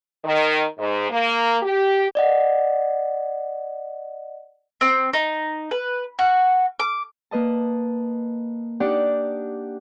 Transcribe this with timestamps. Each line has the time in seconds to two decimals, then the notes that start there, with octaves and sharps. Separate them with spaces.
0.24 D#3
0.79 G#2
1.10 A#3
1.62 G4
2.15 D5 D#5 F#5
4.81 C4
5.13 D#4
5.71 B4
6.19 F#4
6.80 D6
7.31 A#3 B4 D#5 A5
8.80 D4 D#4 G4 D5 F#5